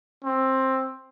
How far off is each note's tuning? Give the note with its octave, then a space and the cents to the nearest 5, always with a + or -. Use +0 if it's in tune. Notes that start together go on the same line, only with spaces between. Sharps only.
C4 +15